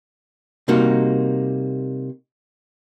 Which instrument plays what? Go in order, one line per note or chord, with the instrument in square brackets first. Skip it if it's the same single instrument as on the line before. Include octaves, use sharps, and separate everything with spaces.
[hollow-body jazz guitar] C3 G3 A#3 D#4 F#4